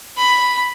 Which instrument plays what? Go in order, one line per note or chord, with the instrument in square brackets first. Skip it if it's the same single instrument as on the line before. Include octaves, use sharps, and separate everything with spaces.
[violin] B5